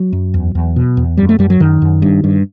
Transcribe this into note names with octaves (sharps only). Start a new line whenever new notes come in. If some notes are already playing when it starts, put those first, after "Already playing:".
Already playing: F#3
F#2
E2
E2
B2
E2
F#2 G3
A3
F#2 G3
F#3
F#2 D#3
F#2
G2
G2